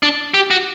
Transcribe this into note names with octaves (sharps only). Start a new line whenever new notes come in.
D4
G4
F#4